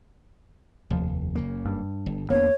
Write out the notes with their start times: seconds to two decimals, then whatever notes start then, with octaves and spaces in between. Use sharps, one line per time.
0.90 F1 D#2 F3
1.35 F#1 C#3 A#3
1.66 G2
2.06 G1
2.30 D1 E2 A#3 B3 D4 C#5